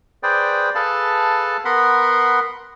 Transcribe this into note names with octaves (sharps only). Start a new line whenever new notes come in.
G#4 B4 C5 D5 G5
G#4 A4 B4 F5 A5
B3 A#4 F#5 B5 C6